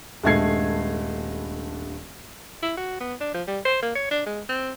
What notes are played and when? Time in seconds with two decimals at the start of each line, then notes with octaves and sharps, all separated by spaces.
0.23 D#1 G2 G#3 A3 G#6 C7
2.62 E4
2.77 F#4
3.01 B3
3.21 D4
3.34 F3
3.47 G3
3.65 C5
3.82 A#3
3.95 C#5
4.11 D4
4.26 G#3
4.49 C4